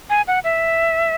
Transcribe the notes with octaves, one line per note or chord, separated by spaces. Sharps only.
G#5
F#5
E5